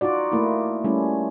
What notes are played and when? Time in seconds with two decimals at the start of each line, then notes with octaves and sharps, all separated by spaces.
0.01 D#4 F4 F#4 D5
0.32 A3 A#3 E4
0.84 G3 A3 C#4 E4